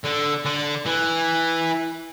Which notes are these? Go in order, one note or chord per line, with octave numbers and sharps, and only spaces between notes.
D3
D3
E3